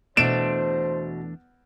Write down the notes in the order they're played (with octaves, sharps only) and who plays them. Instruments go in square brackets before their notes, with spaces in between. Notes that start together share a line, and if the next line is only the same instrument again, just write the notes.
[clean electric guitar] E2 A3 D4 [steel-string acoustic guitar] B2 [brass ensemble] C5 [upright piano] D7 E7